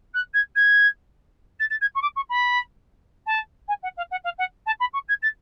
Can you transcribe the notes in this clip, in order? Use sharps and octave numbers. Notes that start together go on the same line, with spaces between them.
F#6
G#6
G#6
A6
A6
G#6
C#6
D6
C#6
B5
A5
G#5
F#5
F5
F#5
F5
F#5
A5
B5
C#6
G#6
A6